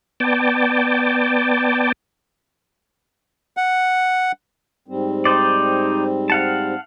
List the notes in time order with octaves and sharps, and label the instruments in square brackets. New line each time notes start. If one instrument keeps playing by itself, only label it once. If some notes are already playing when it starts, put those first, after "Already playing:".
[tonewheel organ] B3 D5 G5 A5
[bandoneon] F#5
[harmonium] G#2 G3 C4
[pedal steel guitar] D#4 C5 D5
F5 F#5 A5